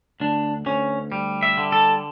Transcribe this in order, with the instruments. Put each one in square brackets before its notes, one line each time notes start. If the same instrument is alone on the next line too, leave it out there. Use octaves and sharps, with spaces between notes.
[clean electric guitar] D2 D4
D2 C#4
G3
E5
D3
A4